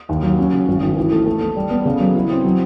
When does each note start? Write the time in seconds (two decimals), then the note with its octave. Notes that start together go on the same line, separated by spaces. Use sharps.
0.09 D#2
0.23 F#3
0.38 C#4
0.53 C#3
0.68 G#1
0.82 D#3
0.96 E3
1.12 A3
1.26 A3
1.41 A3
1.56 G3
1.71 B3
1.85 C#3
2.00 F#3
2.15 E4
2.30 C4
2.44 F#3